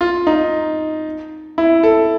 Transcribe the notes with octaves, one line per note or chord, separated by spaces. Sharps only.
F4
D#4
E4
A4